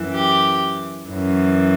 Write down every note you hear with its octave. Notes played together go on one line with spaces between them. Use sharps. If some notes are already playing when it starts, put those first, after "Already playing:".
Already playing: F#2 E3
G4
F#2 E3